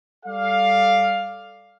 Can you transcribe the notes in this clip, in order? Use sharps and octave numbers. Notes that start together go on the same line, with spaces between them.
G3 A4 D5 F5